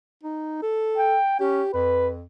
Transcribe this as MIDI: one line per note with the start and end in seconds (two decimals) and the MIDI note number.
0.23 0.58 63
0.62 1.16 69
0.98 1.40 79
1.40 1.62 61
1.40 1.70 67
1.74 2.23 41
1.74 2.10 71